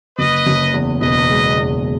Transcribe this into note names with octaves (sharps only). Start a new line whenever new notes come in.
F#1 B4 D#5
F#1
E2
E1 B4 D#5
G#3
E2